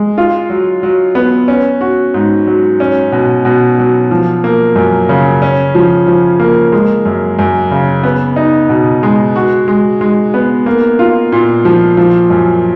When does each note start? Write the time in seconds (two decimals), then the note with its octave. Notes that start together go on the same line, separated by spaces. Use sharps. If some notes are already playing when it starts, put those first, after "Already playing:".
Already playing: G#3
0.18 F4
0.50 F#3
0.83 F#3
1.15 B3
1.48 C#4
1.81 F#4
2.14 G#2
2.47 F#3
2.80 C#4
3.12 B2
3.45 B2
3.79 F#3
4.11 F3
4.44 A#3
4.76 F#2
5.09 C#3
5.42 C#4
5.75 F3
6.07 F3
6.40 A#3
6.72 G#3
7.05 F#2
7.39 F#2
7.71 C#3
8.04 B3
8.36 D#4
8.69 B2
9.03 G#3
9.36 F#4
9.68 G#3
10.01 G#3
10.34 B3
10.66 A#3
10.99 F4
11.32 A#2
11.65 F3
11.97 F3
12.30 F#2